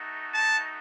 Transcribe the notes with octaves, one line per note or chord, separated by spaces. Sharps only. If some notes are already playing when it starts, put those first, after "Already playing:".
Already playing: A3 D#4 F#4
A5